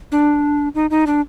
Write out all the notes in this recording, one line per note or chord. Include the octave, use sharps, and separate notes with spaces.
D4
D#4
D#4
D4